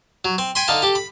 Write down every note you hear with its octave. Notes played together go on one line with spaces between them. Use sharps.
F#3
C4
G5 G#5 B5 C6
D3 D#4 F5 A5
G4 A4
B5